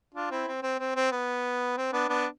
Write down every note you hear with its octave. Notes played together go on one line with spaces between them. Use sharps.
D4 F4
C4 E4
C4
C4
C4
C4
B3
C4
B3 D4
B3 D4